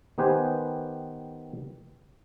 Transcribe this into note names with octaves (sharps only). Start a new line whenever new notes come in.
D#3 B3 G4 B4 C5 G#5